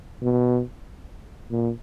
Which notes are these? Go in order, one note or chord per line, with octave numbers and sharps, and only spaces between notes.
B2
A#2